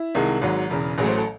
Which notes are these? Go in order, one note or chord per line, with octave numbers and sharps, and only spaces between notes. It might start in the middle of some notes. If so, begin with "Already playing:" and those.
Already playing: E4
C2 C3 D#3 G#3
G#1 G#2 F#3
E1 E2 C#3
A1 A2 F#3 A3 G#4
C5
A4